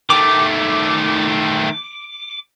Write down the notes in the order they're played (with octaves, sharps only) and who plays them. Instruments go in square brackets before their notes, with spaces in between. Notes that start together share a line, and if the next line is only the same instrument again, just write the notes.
[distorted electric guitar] D#3 A3 [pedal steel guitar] D6